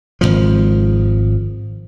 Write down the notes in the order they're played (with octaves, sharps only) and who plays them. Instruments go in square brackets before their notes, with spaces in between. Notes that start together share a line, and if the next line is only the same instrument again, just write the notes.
[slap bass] G#1 C#2 F3